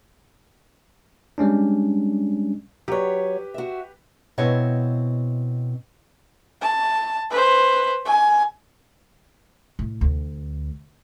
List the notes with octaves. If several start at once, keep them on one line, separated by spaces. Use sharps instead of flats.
G3 G#3 C#4 D4
F#3 G4 B4 C#5
F#4 E5
B2 C4 E4 C#5 D#5
A5
B4 C5
G#5
A2
D2